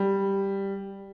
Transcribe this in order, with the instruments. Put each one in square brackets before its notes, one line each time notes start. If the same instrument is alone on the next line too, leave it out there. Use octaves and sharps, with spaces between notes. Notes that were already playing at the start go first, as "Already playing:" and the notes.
Already playing: [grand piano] G3